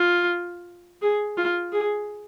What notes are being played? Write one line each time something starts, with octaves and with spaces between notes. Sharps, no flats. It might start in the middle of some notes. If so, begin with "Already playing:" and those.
Already playing: F4
G#4
F4
G#4